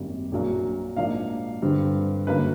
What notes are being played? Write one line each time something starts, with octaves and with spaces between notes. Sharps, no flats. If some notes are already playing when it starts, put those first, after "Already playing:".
Already playing: G#1 F#2 D#3 G3 A#3
A#1 A#2 F#3 A#3 D4
G#2 F3 A#3 D4 F5
G2 D3 G3 C4
F#2 D3 F#3 A#3 C#4 B4